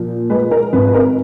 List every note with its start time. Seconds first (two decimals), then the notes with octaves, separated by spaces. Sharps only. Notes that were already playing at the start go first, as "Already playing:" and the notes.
Already playing: A#2 F3
0.30 G#3 B4
0.51 A#4
0.73 G#1 B4
0.87 B4
0.94 A#4